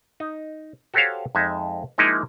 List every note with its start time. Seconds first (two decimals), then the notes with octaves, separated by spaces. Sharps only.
0.20 D#4
0.94 F#4 G4 A4 C5 C#5 F5
1.35 F2 G#3 D#4 E5
1.98 F3 G#3 A#3 D#4 E4